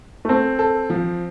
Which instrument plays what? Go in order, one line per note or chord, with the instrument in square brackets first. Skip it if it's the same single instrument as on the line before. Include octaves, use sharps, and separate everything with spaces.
[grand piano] A3
[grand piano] C4 [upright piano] A4
[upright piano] A4
F3